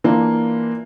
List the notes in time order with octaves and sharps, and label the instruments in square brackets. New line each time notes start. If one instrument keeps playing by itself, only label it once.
[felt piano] E3 A#3 D4 F4